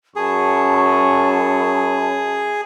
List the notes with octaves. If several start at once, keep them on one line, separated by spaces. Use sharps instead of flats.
F#2 G#4 A5 B5 C#6